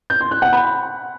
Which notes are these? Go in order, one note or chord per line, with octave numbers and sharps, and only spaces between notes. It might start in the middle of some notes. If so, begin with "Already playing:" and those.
G6
C6
F#6
F#5
B5